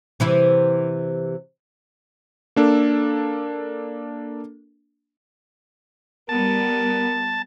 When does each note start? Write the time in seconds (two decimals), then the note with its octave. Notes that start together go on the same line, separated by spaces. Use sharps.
0.20 C3 E3 E4
2.56 A#3 D4 A4
6.29 G3 B3 A#4 A5